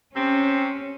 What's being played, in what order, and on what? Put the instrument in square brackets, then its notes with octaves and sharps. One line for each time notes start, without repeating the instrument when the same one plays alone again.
[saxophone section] C3 C4 [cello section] C#4